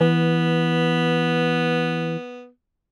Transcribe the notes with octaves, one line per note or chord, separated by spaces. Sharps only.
E3 B3